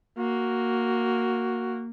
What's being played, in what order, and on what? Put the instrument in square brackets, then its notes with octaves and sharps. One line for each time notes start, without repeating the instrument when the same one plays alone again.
[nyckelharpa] A#3 [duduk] F#4